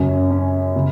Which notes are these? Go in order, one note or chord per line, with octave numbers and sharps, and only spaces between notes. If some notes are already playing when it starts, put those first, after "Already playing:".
Already playing: F#2 C#3 C#4
C#4
C#3